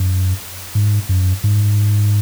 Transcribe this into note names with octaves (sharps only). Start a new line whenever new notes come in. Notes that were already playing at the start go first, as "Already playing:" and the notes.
Already playing: F#2
G#2
F#2
G#2